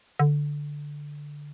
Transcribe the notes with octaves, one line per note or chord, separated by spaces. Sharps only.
D3